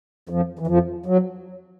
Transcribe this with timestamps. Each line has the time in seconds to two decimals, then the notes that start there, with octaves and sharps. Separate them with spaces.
0.29 F2 F3
0.59 E3
0.67 F2 F3
1.06 F#3